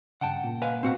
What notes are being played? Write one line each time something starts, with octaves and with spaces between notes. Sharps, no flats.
G2 C#3 F#5 G5 A5
A#2 A#3
B4 F5 G#5
A2 C3 C4 F#4 F#5